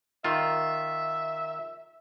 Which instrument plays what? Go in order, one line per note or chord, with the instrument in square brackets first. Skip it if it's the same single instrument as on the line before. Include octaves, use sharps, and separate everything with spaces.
[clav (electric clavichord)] D#3 F4 [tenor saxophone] E5